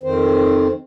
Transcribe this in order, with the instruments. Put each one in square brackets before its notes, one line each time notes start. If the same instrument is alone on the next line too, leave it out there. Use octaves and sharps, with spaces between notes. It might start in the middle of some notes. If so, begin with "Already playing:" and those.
[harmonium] F2 D#3 C4 C5